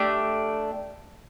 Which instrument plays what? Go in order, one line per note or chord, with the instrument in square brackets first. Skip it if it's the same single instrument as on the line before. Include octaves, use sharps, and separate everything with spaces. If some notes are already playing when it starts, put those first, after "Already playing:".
Already playing: [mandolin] A3 D4 G4 F6